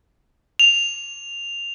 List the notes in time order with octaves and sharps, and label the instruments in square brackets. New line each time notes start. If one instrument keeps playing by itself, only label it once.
[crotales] F7